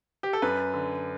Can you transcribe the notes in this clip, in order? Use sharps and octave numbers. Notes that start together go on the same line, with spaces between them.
G4
A4
F#2 B4
D3